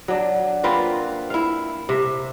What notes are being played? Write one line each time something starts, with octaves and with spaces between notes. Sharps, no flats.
F#3 D4
A#3 C4 F4 B4
E4 F5
C3 E5